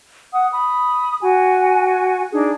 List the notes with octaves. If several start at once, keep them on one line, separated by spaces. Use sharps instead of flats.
F#5 D#6
B5 D#6
F#4 G#5
D4 D#4 G#4